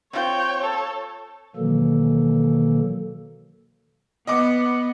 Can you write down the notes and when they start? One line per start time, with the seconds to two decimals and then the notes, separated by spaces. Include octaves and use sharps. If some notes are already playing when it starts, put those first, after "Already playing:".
0.13 C4 F4 C5 C#5 G5
0.61 A4
1.56 B2 D#3 E3 F#3 A#3 A4
4.27 B3 D#5 D6